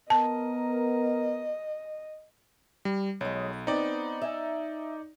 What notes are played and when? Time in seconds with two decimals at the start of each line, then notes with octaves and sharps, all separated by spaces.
0.10 B3 A#4 D#5 A5
2.85 G3
3.21 B1 F#3 G#3
3.67 B3 C4 D#4 D5
4.22 E5 G#5